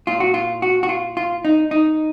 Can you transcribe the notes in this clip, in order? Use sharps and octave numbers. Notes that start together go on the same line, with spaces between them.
A#2 F4
F#4
F4
F#4
F#4
F4
F4
D#4
D#4